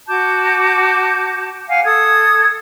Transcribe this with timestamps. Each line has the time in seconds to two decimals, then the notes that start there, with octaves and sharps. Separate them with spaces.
0.08 F#4 A5 D6 G6
1.69 F5 F#5 G#5
1.84 A4 D#6 G#6